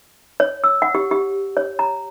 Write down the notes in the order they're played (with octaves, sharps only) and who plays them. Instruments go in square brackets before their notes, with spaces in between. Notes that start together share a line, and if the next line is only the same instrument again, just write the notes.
[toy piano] C#5
E6
F#5
G4
G4
C#5
A#5